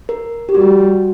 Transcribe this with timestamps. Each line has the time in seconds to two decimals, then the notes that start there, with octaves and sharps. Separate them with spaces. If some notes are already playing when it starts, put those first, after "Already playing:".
0.09 A#4
0.49 G4
0.55 G3 F#4